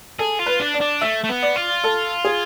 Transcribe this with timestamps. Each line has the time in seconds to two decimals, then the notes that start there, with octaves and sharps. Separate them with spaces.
0.19 G#4 A4
0.39 F4
0.46 B4
0.60 D4
0.74 D5
0.81 D4
1.01 A3 E5
1.24 A3
1.29 B3
1.42 D5
1.56 F4
1.84 A4
2.25 G#4